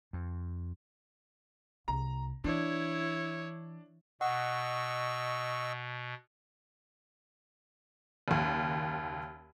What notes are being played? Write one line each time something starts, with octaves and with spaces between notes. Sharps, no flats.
F2
C2 A#5
E3 D4 E4 C#5
B2 D#5 F#5 C#6 E6
F#1 D#2